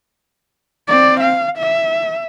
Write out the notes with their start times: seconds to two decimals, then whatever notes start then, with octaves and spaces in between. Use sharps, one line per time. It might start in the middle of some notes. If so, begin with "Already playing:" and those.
0.88 C4 D5
1.20 F5
1.58 E5